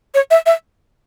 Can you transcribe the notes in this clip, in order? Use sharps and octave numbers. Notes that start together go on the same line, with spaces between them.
C#5
E5
E5